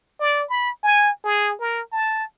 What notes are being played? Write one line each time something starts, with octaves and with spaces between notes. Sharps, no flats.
D5
B5
G#5
G#4
A#4
A5